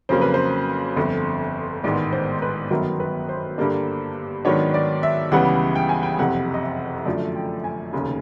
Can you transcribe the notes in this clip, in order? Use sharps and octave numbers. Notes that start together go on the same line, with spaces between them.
F2 C#3 F#3 A#3 C5
B4
C5
G1 F2 D3
A1 G#2 D#3 G#3 B3 D5
C5
B4
G1 F#2 D#3 F#3 B3 A#4
B4
C5
G2 D3 G3 A#3 D4
G#2 D#3 F#3 B3 D4 C#5
D5
E5
C#2 C#3 E3 G3 B3 F#5
G5
G#5
G5
F#1 F2 C3 F#5
D#5
E5
F#2 D3 F3 A3 D5
G5
G#5
F1 D#2 C#3